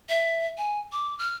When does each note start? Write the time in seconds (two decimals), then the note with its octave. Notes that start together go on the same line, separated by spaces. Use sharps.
0.09 E5
0.58 G#5
0.92 D6
1.19 F6